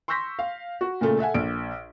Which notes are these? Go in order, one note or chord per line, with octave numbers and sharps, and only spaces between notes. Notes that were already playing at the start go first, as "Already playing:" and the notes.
C6 C#6 E6 G6 A#6 B6
F5
F#4
A#2 C#3 A3 A4
A4 E5 F#5 G#5
A#1 D7